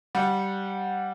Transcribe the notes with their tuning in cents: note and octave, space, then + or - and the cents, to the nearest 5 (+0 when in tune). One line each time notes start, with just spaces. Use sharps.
G3 -10 F#5 -20